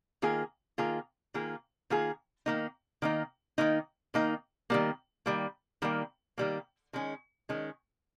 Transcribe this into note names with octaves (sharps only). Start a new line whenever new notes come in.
D#3 A#3 F4 G#4
D#3 A#3 F4 G#4
D#3 A#3 F4 G#4
D#3 A#3 F4 G#4
D#3 A#3 D#4
D#3 A#3 D#4
D#3 A#3 D#4
D#3 A#3 D#4
D#3 G3 A#3
D#3 G3 A#3
D#3 G3 A#3
D#3 G3 A#3
D#3 G#3 C#4
D#3 G#3 C#4